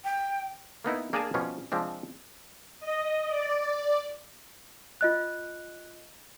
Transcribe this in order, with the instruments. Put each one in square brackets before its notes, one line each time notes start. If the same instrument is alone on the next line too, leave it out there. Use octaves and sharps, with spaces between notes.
[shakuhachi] G5
[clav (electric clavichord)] A#3 B3 D#4 E4
A#3 D4 G#4 A#4 G#5 A5
B2 F3 G3 C#4 F4
C3 F3 G#3 C4 D4
[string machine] D#5
D5
[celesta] F4 D#5 F#6